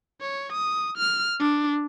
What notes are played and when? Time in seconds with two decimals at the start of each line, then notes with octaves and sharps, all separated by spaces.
0.21 C#5
0.53 D#6
0.97 F6
1.40 D4